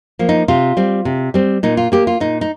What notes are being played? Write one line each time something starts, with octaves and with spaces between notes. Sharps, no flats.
F3 A#3
D#4
C3 F4
G3 C4
C3
G3 C4
A#2 D#4
F4
A#3 G4
F4
A#2 D#4
D#4